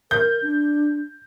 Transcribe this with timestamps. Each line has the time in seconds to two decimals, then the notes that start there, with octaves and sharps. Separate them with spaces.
0.11 A#4 G6
0.42 D4